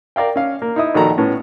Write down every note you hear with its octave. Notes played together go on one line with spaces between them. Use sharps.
A#4 D5 F5 G5
C#4 F5
A#3
D#4 E4 D#6
A#1 D#3 F#4 A4 F#5 A#5
A2 B3 C#4